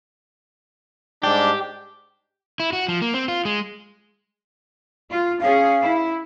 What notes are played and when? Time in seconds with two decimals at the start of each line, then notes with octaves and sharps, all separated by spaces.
1.23 G#2 G3 D4 G4
2.60 E4
2.73 F#4
2.88 F3
3.02 A#3
3.14 C4
3.28 F4
3.45 G#3
5.10 F4
5.41 C#4 G#4 F5
5.82 E4